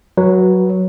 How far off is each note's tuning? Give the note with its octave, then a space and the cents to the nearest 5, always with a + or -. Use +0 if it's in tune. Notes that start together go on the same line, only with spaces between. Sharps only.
F#3 +0 B4 -20